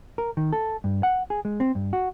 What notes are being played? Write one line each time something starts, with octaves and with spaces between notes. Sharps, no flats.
A#4
D#3
A4
G2
F#5
G#4
G#3
C4
G2
F#4